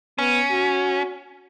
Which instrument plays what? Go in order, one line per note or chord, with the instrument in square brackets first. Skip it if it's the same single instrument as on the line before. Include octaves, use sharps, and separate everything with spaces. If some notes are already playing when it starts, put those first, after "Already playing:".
[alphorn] B3 [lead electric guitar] C#4
[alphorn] F#4